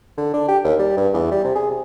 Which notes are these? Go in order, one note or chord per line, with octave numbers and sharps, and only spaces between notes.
D3
D4
G4
D#2
G3
G2
E2
G3
C3
G#4
C3